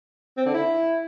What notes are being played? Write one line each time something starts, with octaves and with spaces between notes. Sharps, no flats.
C4
D3
E4